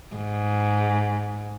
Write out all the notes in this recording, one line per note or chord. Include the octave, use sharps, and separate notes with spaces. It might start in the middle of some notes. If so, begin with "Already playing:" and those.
G#2